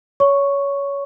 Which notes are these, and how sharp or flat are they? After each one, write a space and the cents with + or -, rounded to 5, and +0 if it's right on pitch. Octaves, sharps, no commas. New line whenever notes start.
C#5 +20 C#6 +0